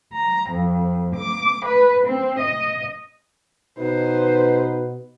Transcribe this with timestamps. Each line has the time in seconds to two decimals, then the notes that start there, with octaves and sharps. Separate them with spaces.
0.14 A#5
0.51 F2
1.15 D6
1.65 B4
2.06 C4
2.39 D#5
3.79 B2 D#4 B4 C5